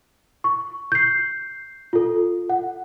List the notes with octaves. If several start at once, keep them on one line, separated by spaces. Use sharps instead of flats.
C#6
G6 C7
F4 A4
F#5